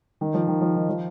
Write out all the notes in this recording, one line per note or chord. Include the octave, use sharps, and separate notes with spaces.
D#3
F3
D#3
F3
D#3
F3